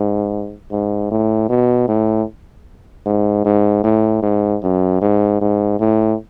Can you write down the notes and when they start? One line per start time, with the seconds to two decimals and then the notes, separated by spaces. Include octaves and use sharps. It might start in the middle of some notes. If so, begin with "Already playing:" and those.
Already playing: G#2
0.72 G#2
1.11 A2
1.49 B2
1.88 A2
3.06 G#2
3.45 G#2
3.83 A2
4.22 G#2
4.63 F#2
5.01 G#2
5.41 G#2
5.80 A2